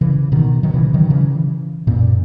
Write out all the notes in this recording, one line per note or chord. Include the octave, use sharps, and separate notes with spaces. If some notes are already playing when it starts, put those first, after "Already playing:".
C#3 E3
B2 D#3
D#3 F#3
C#3 E3
D#3 F#3
C#3 E3
F#2 A#2